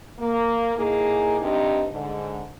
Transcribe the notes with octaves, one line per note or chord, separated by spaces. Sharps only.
A#3
A2 A#3 D#4 G#4
G2 C3 C4 D#4
G#2 D3